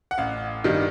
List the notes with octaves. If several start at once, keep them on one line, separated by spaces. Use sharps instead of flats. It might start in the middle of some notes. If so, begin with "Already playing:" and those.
F#5
A1 F5
G2 D#3 G3